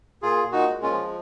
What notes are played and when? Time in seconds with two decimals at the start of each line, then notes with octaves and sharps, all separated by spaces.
0.22 A#2 F4 G#4
0.45 A#2
0.52 D#4 F#4
0.68 G#3
0.82 C#4 F4
0.90 F3